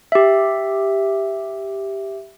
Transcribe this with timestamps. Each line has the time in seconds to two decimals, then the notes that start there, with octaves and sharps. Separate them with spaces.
0.12 G4 E5